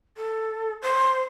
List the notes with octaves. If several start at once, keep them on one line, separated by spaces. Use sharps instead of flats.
A4
C5